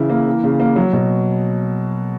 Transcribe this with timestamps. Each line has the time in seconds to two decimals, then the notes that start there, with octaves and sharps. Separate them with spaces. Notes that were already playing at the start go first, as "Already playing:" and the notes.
Already playing: C#3 E3 E4
0.09 A#3
0.27 E3
0.44 C#3
0.60 A#3
0.76 F#3
0.93 B2